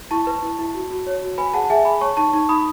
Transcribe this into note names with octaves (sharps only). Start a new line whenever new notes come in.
E4 A5 C#6
B4
E4
E4
F#4
F#4
C#5
F#4
B4 G#5 B5
G#4 F#5 A5
A5
G#4 E5 G#5
G#4 G#5 B5
C#5 A5 C#6
D#4 A5 C#6
D#4 A5 C#6
D#4 B5 D#6